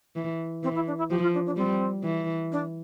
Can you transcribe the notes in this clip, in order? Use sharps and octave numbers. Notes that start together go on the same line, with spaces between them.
E3
E3 C4
E4
D4
E4
F3 G4
F4
D4
D4
G3 C4
E3
D4